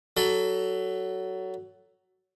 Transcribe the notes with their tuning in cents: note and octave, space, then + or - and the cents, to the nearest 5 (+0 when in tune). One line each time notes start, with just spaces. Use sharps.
F#3 +15 A4 +0 B5 +25